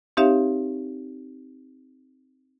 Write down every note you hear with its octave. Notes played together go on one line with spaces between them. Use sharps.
C4 D#4 G4 C#5 E5 F5